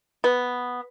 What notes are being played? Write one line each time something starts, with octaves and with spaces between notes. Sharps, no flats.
B3